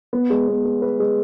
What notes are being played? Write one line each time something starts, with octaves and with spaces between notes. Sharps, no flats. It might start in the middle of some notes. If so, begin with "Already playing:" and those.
B3
G#3
B3
B3
B4
G#3